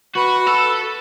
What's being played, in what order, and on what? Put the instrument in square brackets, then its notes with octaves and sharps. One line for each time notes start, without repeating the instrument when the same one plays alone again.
[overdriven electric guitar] F#4 [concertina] B4
[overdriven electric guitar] A4